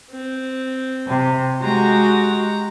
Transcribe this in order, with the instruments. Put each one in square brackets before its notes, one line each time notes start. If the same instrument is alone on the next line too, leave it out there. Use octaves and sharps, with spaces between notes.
[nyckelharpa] C4
[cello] C3
[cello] G#3 F#4 [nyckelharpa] G4 A#5